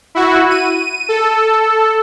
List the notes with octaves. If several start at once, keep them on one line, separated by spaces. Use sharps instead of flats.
E4 F#4
D#7
A4